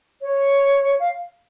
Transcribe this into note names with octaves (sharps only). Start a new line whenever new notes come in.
C#5
F5